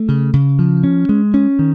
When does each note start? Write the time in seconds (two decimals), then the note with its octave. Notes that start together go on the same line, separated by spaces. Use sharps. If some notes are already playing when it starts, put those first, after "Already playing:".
Already playing: A3
0.09 C#3
0.33 C#3
0.59 F3
0.84 C#4
1.09 G#3
1.34 C#4
1.59 D#3